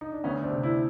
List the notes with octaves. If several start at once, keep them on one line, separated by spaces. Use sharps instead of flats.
D#4
D4
D2 B3 C#4
C4 D4
C3
D4 E4